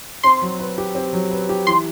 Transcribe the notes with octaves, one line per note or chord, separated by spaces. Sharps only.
C4 C6
F#3
B4
G4
C4
F#3
B4
G4
E3 C6